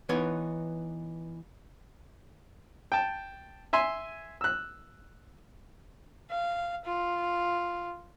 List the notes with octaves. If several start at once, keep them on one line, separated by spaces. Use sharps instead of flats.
E3 B3 D#4 C#5
G5 A5
E5 G#5 C6
E6 F#6
F5
F4